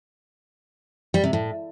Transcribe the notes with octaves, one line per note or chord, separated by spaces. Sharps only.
G3
C3
A2